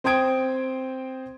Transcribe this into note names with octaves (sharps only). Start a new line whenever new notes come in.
C4 C5 G5 D#6 G#6 D7